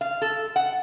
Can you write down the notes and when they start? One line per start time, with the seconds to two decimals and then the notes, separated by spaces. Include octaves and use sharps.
0.01 F5
0.22 A4
0.56 F#5